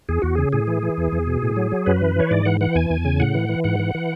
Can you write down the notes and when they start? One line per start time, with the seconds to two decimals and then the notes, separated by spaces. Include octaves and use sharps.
0.09 E2 G#4
0.22 E2 F#4
0.35 C#3 G#4
0.53 A2 G#4
0.67 E3
0.83 E3
0.98 E2
1.12 E2
1.27 B2
1.42 A2
1.56 F#3
1.72 F#3
1.86 F#2 B4
2.01 E3
2.16 E3 C#5
2.31 G#2 D5
2.45 E3 F#5
2.61 E3 F#5
2.75 E2 G#5
2.90 E2
3.05 C#3
3.20 A2 F#5
3.34 E3
3.49 E3
3.64 G#2 F#5
3.80 E3
3.95 E3